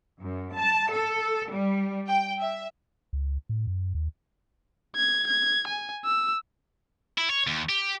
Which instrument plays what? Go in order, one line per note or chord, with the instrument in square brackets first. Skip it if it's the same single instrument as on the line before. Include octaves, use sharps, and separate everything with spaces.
[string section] F#2
A5
A4
G3
G5
E5
[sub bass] C#2
A2
F#2
D#2
[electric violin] G#6
G#6
G#5
E6
[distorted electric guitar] E4
C#5
D#2
G4